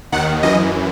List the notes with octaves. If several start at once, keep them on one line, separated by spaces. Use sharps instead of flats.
D#2 D#3 F#5
F#2 E3 D#5